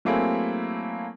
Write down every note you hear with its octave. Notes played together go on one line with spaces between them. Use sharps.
F#3 A3 A#3 C4 E4 G#4